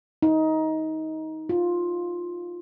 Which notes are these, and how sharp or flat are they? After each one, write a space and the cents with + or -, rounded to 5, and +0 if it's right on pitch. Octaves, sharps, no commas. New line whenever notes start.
D#4 +20
F4 +10